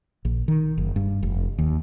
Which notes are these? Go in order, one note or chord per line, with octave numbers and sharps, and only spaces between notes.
A#1
D#3
F#1
G2
F1
D#2